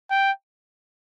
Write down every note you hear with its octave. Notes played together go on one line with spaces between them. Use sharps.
G5